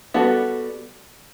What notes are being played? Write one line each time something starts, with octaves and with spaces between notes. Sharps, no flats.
G3 B3 F#4 A4